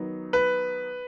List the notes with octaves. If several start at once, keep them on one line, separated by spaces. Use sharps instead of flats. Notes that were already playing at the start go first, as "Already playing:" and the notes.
Already playing: D#3 F#3 B3 D#4
B4